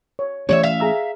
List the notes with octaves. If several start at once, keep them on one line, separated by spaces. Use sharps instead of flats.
C#5
E3 A3 C#4 G4 C#5 D5 E5
E5 F5
G#4 A#5 E6